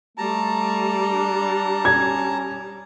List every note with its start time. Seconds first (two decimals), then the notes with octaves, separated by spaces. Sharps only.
0.18 G3 A3 A5 A#5
1.07 D4
1.85 C#4 G#6